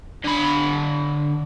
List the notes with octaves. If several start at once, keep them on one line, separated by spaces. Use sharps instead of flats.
D3 B5